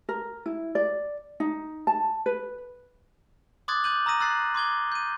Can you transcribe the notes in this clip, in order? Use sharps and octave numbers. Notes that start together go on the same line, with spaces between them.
A#4
E4
D5
D#4
A5
B4
C6 D6 D#6 F#6 G#6 A6
D6 G6 D#7 F#7
A#5 D#6 E6 A#6 D#7
C6 E6 F#6 A6 C7
C6 D6 G#6 G7
G6 D#7